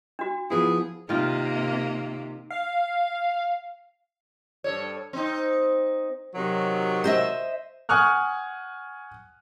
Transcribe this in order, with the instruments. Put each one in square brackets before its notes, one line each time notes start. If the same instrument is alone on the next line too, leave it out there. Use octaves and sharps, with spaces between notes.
[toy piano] D4 F#4
[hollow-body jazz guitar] F3 B3 E4 [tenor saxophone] G#4
[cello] C3 A#3 [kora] D#3 F4
[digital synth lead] F5
[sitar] G2 A4 C#5
C4 D#4
[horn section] C3 D#3 F#3
[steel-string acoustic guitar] C5 D#5 E5
[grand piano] F#5 G#5 C#6 D#6 F6 F#6